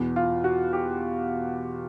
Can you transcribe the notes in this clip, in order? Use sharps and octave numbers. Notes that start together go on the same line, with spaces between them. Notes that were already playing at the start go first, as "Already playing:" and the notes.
Already playing: E2 B2
F4
F#4
G4